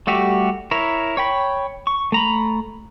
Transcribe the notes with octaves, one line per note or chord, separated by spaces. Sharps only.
G3 A3 F#4 G4
E4 A#4 C#5
C#5 G5 B5
C#6
A3 A#5 B5